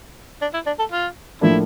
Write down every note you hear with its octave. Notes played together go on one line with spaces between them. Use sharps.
D4
E4
D4
A4
F4
A2 F3 A#3 D4 E4